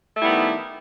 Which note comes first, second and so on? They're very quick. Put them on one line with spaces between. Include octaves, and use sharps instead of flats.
A3 E4 G3 B3 D#3